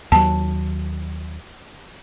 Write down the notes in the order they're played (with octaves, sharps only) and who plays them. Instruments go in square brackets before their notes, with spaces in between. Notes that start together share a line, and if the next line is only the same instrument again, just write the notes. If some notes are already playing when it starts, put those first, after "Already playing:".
[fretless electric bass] D#2 F#3 [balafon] A5